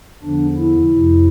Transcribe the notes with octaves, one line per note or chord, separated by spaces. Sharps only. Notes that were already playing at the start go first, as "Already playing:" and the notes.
E2 D3 F3 D4
E4
F2 C3 F3